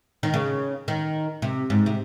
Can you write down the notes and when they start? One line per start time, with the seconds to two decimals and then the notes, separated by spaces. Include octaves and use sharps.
0.23 D#3
0.34 C#3
0.88 D#3
1.42 C3
1.70 G#2
1.86 C3